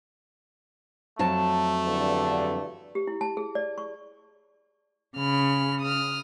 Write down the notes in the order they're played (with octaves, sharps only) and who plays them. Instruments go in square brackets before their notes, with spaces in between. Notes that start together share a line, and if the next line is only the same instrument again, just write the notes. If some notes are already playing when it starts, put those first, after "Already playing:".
[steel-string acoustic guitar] F2 F#3 A5 [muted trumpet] A3
[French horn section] E2 G2 D3
[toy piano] G4
E4
A5
G#4
D5
C#6
[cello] C#3 [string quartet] B5 F6
[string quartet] D#6 F6